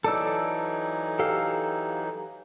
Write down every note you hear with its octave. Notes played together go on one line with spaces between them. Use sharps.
E3 F#3 D#4 A4 D5 E6
G4 A4 F5